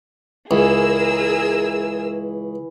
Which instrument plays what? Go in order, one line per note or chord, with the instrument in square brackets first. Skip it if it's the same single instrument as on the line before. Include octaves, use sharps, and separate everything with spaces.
[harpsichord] C#2 [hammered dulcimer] E3 [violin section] G#4 A#4 E6